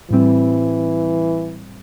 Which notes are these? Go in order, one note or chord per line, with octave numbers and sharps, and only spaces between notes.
A2 E3 G3 C4